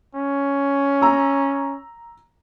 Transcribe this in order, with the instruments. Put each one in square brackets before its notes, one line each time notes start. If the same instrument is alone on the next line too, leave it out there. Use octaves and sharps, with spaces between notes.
[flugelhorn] C#4
[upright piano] A#5 E6